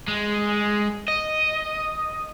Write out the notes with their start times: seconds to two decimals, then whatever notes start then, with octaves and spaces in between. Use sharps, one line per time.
0.08 G#3
1.08 D#5